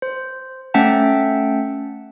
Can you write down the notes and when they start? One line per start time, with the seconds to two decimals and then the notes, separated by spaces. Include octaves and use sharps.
0.02 C5
0.74 A3 C#4 E5 F#5 G5 A5